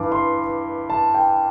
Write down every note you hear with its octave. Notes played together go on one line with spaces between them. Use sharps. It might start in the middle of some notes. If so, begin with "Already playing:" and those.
Already playing: G2 E3 D6
C6
A5
G5